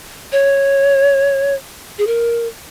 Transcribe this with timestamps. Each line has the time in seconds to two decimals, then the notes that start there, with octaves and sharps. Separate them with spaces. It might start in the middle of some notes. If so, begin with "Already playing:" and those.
0.32 C#5
1.98 G#4
2.07 A#4